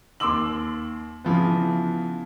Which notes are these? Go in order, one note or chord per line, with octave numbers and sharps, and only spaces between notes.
D#2 C6 D6 E6 F#7
C#3 E3 F3 B3